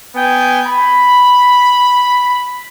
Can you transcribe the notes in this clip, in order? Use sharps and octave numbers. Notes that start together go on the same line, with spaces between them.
B3 G5 G#5
B5